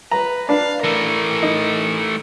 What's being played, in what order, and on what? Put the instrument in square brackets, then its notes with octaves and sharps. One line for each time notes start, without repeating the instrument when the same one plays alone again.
[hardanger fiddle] B4 [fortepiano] A#5
[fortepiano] D4 B4 [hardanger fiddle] F5
[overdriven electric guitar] E3 A3 [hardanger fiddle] A#4
[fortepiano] D#4